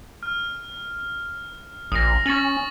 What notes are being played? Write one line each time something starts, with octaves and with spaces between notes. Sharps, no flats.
F6
A#1 D#6 A#6
C#4 C#6 A6 F#7